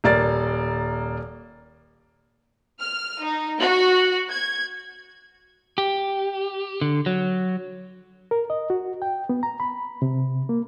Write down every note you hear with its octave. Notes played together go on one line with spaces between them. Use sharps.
D#1 A#3 D5 A6
F6
D#4
F#4
G#6
G4
D3
F#3
A#4
D#5
F#4
G5
B3
A#5
B5
C3
A#3